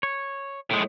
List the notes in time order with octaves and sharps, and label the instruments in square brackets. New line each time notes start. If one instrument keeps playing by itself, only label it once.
[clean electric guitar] C#5
[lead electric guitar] A2 G#3